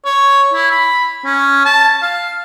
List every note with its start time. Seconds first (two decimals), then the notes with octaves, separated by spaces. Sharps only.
0.05 C#5
0.54 E4
0.72 B5
1.25 C#4
1.65 A5
2.02 F5